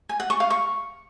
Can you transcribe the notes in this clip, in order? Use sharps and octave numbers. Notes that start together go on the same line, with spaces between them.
G#5
F#5
C#6
F5
C#6